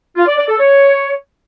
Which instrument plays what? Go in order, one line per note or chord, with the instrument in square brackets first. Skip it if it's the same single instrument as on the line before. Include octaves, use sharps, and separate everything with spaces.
[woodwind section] F4
D5
D5
A4
C#5